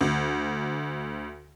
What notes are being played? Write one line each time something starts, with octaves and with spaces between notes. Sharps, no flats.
D2